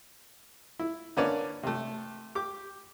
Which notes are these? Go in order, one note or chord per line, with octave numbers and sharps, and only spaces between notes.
E4
D3 A#3 C#4 B4 C#5 D5
C3 A3
G4 D6